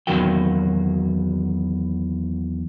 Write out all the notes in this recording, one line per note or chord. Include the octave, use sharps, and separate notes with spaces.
E2 D#3 F#3 A#3 F#4 G5